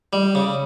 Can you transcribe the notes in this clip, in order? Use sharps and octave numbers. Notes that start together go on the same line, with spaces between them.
G3
C#3